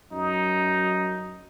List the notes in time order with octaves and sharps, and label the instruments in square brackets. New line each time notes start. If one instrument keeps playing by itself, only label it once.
[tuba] F#2 [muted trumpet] D#4